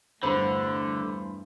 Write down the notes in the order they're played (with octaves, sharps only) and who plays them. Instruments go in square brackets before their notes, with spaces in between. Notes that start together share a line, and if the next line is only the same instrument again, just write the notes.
[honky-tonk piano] E2 G2 [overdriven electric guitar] D3 [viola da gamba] A3 [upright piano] C5 B5